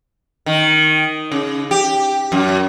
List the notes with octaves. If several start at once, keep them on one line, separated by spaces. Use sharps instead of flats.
D#3
C#3
G4
F#2